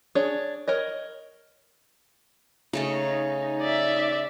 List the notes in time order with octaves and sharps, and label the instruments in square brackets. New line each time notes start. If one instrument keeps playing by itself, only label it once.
[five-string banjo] D4 G#4 C#5
A#4 C#5 D#5
[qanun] C#3 A3 C#4 [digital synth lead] D#4
[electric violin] D5 E5